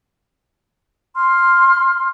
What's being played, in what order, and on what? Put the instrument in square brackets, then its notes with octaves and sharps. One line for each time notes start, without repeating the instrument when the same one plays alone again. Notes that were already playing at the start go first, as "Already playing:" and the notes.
[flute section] C6 F6